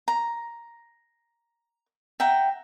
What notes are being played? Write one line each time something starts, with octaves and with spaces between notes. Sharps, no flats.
A#5
E5 F#5 G5 A#5